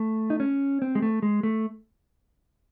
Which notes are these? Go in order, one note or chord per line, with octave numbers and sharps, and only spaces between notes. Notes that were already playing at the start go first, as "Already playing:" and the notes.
Already playing: A3
D#4
C#4
C4
G#3
A3
G#3
A3